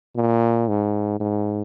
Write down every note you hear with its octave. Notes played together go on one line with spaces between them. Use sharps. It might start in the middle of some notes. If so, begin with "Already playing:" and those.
A#2
G#2
G#2